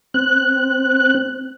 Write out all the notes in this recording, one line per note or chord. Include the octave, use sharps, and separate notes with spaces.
C4 F#6